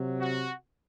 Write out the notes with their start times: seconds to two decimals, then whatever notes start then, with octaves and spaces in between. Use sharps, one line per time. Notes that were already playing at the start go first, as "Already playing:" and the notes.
Already playing: C3 F#3
0.20 F#4